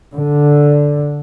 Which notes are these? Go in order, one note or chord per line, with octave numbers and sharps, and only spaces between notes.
D3